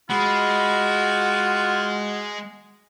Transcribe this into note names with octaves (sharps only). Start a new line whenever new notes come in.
G#3 F4 F#4 B5